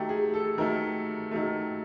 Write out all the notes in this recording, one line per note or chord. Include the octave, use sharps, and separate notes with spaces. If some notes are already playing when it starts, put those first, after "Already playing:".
Already playing: D#3 F#3 A3 G4
G#4
A4
D#3 F#3 A3 A#4
D#3 F#3 A3